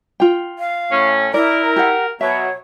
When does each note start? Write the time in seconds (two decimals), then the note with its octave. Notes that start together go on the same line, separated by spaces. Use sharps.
0.20 F4 G5
0.59 F5
0.92 A2 C#4
1.34 E4 A#4 D5
1.76 G4 F#5
2.21 B2 F#3 C#5 E5